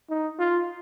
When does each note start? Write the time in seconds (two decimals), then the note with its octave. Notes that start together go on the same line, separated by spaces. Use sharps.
0.10 D#4
0.39 F4